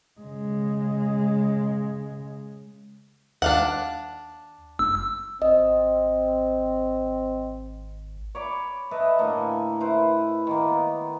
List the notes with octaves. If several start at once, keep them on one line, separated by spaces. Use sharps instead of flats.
C#3 G#3
D#2 D4 F5 F#5
F#1 E6
G#1 C4 D#5
C#5 D5 B5 D6
A4 B4 D#5 E5
A2 D3 A#3 G#5
E4 B4 C5
D#3 A#3
B3